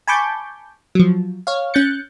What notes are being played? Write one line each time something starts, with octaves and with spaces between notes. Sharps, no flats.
G#5 A5 B5 C#6 D6 G6
F3 F#3
C#5 F5
C#4 F#6 G6 A6 C#7